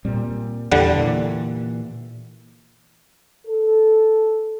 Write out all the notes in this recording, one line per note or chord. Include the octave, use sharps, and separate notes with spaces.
A#2 G3 C4
E2 D3 G3 F#5
A#2 E3
A4